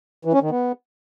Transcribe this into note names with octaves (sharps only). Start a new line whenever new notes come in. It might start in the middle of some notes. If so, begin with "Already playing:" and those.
E3
C#4
D#3
B3